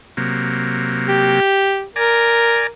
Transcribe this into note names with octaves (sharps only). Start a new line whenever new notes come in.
C3 F#3 A#3
G4
A#4 D5 G#5 A#5